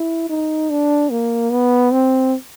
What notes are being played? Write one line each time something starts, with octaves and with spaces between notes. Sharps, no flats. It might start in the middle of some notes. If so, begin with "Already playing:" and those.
Already playing: E4
D#4
D4
A#3
B3
C4